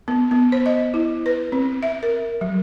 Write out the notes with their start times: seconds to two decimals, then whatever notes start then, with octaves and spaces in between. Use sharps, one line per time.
0.08 B3
0.31 B3
0.52 C5
0.66 D#5
0.94 E4
1.26 B4
1.52 C4
1.83 E5
2.03 A#4
2.41 F#3